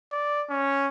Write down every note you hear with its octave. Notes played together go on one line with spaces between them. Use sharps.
D5
C#4